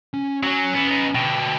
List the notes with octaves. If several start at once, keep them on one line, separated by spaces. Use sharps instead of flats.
C#4
F#3 C#4 G#5
E3 B3
B3 D#4
B2 D3 G5